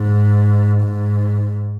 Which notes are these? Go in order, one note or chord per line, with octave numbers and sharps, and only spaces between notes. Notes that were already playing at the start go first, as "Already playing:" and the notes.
Already playing: G#2
G#2